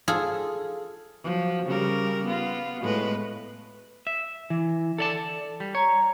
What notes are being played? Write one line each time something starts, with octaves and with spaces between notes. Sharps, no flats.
F4 G#4 A4
F3 F#3
C#3 G3 A#4
B3 F4
A2 G#3 B4
E5
E3
A4 D5 A5
G3
C#5 A#5